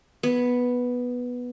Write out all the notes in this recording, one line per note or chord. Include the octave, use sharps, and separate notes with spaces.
B3